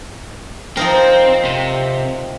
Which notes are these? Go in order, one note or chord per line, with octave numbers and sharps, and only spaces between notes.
F3 C4 D#4 A#4
C3